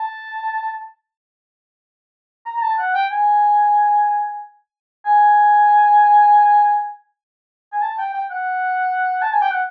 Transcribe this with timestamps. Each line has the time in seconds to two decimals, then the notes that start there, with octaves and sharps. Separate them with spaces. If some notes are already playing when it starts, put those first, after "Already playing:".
Already playing: A5
2.46 A#5
2.57 A#5
2.62 A5
2.79 F#5
2.95 G5
3.11 G#5
5.06 G#5
7.73 G#5
7.82 A5
7.99 G5
8.14 G5
8.31 F#5
9.22 A5
9.32 G#5
9.42 G5
9.51 F#5